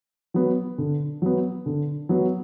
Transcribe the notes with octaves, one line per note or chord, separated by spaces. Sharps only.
F#3 B3
D3
F#3 B3
D3
F#3 B3